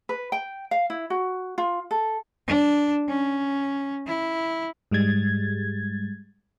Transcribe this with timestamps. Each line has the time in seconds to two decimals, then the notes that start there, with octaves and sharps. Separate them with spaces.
0.09 B4
0.32 G5
0.71 F5
0.90 E4
1.10 F#4
1.58 F4
1.91 A4
2.47 D4
3.08 C#4
4.06 E4
4.91 G#2 G3 G#3 G#6 A6